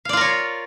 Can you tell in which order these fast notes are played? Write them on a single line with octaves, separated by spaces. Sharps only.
F5 D5 F4 A#4 C#5